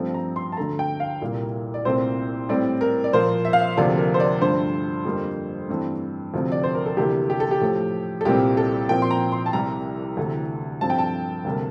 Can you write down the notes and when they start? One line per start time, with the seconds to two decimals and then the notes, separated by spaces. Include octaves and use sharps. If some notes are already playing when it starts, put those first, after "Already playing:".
Already playing: G2 F3 A3 C4
0.14 A#5
0.36 C6
0.52 A5
0.57 D2 D3 A3 A#5
0.79 G5
1.00 F5
1.22 C2 A#2 G3 A#3
1.74 D5
1.85 C2 A#2 A3 C4 C5
2.49 A2 G3 C4 D5
2.81 A#4
3.04 D5
3.13 A#2 F3 A#3 C5
3.45 E5
3.53 F5
3.60 E5
3.77 D2 C3 F3 A#3 D5
3.98 A#4
4.14 C5
4.20 D5
4.41 G2 D3 F3 A3 C5
5.05 F2 D3 G3 A#3
5.69 G2 E3 A3 C4
6.34 D2 C3 F3 A3 C4
6.52 D5
6.64 C5
6.75 A#4
6.86 A4
6.97 D2 C3 E3 A#3 G4
7.30 G4
7.40 A4
7.51 G4
7.61 A2 F3 A3
8.21 A4
8.25 C2 A#2 G3 C4 G4
8.57 A4
8.89 A#2 F3 C4 G5
9.02 C6
9.11 A#5
9.32 C6
9.46 A5
9.53 C2 C3 G3 A#5
10.17 D2 C3 E3 A3
10.81 G2 F3 C4 A5
10.90 G5
10.98 A5
11.45 D2 C3 G3 A#3